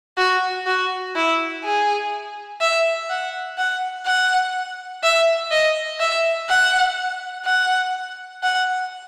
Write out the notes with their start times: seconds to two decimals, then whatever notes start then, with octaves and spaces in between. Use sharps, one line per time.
0.18 F#4
0.66 F#4
1.15 E4
1.64 G#4
2.60 E5
3.10 F#5
3.58 F#5
4.06 F#5
5.03 E5
5.52 D#5
6.00 E5
6.49 F#5
7.45 F#5
8.43 F#5